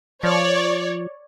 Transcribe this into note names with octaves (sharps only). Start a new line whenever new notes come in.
F3 C#5 D5